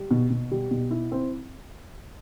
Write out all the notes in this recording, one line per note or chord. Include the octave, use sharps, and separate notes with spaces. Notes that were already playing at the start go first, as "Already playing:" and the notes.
Already playing: G3
B2
B2
G3
B2
E4
C4